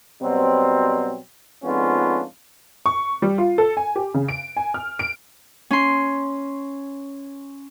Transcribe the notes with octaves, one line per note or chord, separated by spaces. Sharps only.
B2 F#3 G3 C4
F2 G#2 B3 C#4 D4 F4
C#6
G3
F4
A4
G#5
G4
C#3
D7
G#5
F6
D7
C#4 C6